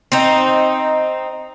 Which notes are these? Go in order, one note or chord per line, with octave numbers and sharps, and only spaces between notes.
C4 D#4